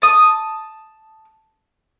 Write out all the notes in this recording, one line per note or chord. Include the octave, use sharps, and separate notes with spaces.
A5 D#6